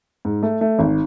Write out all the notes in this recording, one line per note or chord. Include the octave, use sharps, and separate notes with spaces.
G#2
A3
A3
G#1